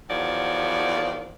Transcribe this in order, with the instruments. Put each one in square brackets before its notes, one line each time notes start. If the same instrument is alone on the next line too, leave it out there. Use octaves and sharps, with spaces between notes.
[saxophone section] E2 D#3 F3 F#3 D5